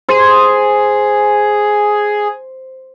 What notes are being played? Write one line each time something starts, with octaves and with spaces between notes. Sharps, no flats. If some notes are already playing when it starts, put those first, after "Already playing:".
G#4 C5